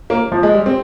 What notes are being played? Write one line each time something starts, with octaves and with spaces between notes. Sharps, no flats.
A#3
F3
G#3
G3
C4